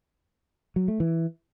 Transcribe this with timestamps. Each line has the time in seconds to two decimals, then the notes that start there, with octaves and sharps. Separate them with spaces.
0.76 F#3
0.88 A3
1.00 E3